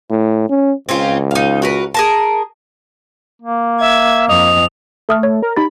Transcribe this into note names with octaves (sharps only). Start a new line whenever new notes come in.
A2
C#4
C#2 C4 C#4 F4
D#4 F5
F#4 A#4 B4
G#4 A#4 A5
A#3
E5 G#6
F2 D#5 F7
A3 A4 D#6 F6
C#5
A#4
D#4 G4 B5 A6